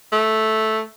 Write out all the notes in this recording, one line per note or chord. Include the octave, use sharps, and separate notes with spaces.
A3